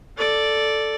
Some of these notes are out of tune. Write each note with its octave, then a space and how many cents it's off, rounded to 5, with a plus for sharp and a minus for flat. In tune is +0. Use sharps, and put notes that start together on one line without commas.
A4 +0 D5 +0